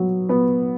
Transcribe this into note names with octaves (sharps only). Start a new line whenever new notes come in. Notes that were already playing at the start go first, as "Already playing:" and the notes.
Already playing: F#3 B3
B3